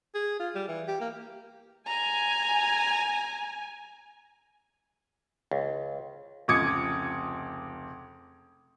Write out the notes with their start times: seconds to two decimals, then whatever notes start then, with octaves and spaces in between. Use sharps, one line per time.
0.15 G#4
0.39 F4
0.55 G3
0.68 E3
0.88 G4
1.00 A#3
1.88 G#5 A#5
5.51 C#2
6.48 F1 C#2 D6 D#6 G#6 C#7